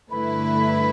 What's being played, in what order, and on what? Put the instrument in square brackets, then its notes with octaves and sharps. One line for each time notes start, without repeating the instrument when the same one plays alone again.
[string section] G2 D3 A3 E4 B4 [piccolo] B5